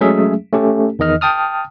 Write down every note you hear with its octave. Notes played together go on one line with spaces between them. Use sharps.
F#3 G#3 A3 C#4 G#4 E5
A3 C#4 G4 A4
E2 D#3 D#5 F6
G5 A5 D#6 F6